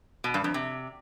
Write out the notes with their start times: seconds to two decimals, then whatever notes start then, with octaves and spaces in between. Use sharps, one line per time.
0.24 B2
0.34 G2
0.44 F2
0.54 C3